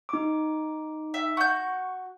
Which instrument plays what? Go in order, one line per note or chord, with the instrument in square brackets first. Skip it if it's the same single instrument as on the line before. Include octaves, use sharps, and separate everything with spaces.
[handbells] D#4 D6
[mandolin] E5
[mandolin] F#4 G6 [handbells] C#6